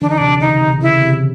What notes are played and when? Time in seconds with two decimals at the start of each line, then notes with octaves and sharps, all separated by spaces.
0.01 D3 E3 D4
0.10 D#4
0.18 C3 D4
0.41 C#3 D#4
0.61 C3
0.81 C#3 E4
1.02 C3